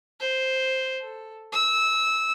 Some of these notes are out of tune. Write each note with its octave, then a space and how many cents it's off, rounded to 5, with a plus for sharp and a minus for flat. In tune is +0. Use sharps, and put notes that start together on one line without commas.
C5 +0
A4 +0
E6 -20